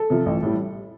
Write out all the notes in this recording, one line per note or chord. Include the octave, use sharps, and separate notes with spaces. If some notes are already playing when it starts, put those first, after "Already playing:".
Already playing: A4
C3 F3
A1
A2 G3